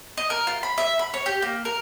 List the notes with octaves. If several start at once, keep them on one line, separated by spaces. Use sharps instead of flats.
D#5
A#4
F4
B5
E5
B5
C#5
G4
A#3
A#4